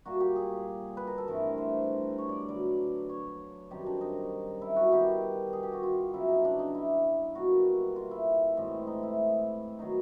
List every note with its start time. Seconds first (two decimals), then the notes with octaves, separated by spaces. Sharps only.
0.06 A#2 G3 A#3 F#4
0.20 G4
0.36 G#4
0.97 B4
1.07 A#4
1.18 A4
1.27 G2 E3 A3 C4 A#4
1.58 C5
2.18 C#5
2.29 D5
2.49 D3 F#3 B3 D5
3.09 C#5
3.70 F#2 D#3 G3 C4 G4
3.86 D4
4.01 D#4
4.62 E4
4.76 F#4
4.92 D#3 G3 B3 G4
5.53 G#4
5.63 G4
5.73 F#4
5.83 F4
6.14 C#3 F#3 B3 E4
6.28 D#4
6.45 D4
6.59 D#4
6.75 E4
7.35 B2 G3 A#3 F#4
7.96 F4
8.11 E4
8.57 A2 E3 G#3 C4
8.87 D#4
9.03 E4
9.79 D#3 F#3 B3 D#4